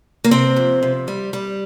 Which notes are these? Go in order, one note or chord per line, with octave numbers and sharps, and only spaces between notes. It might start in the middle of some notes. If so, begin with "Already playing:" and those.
A#3
C3 C4
F2
C3
G3
G3